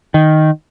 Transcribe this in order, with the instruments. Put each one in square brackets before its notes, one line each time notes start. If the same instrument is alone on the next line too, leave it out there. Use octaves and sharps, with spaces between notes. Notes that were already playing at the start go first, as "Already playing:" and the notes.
[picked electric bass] D#3